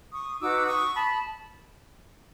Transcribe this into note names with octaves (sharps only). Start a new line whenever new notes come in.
C#6 D#6
D#4 F#4 B4 D6 E6
C#6 D#6
A5 B5